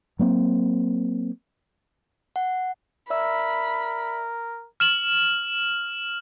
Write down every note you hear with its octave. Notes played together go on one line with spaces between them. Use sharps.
F#3 A#3 C4
F#5
A#4 D5 E5 B5 E6
F6 E7 F#7